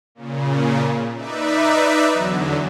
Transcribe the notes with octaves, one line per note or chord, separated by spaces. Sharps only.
A#2 C#3
D#4 B4 D5 E5
E2 D3 F#3